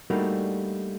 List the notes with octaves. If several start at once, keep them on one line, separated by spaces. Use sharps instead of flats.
G3 A3 A#3 D4 D#4 F#4